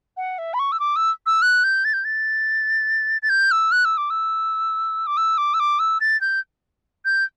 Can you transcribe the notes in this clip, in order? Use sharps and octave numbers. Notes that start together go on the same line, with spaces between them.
F#5
E5
B5
C#6
E6
D6
E6
E6
F#6
G6
A6
G6
A6
A6
G6
E6
F#6
E6
D6
E6
D6
E6
D6
E6
D6
E6
A6
G6
G6